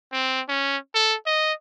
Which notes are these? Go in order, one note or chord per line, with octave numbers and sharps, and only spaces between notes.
C4
C#4
A4
D#5